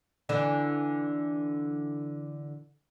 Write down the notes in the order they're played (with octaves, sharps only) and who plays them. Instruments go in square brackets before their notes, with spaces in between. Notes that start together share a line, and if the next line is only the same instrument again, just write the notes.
[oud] D3 E3 D4